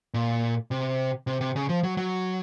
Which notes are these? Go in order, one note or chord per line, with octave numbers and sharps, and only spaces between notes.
A#2
C3
C3
C3
C#3
F3
F#3
F#3